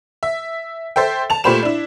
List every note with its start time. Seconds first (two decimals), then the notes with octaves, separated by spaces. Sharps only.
0.23 E5
0.96 A4 C5 E5 G5
1.30 A5 F7
1.44 A#2 A3 G4 C5 B5 E7
1.63 D4 E4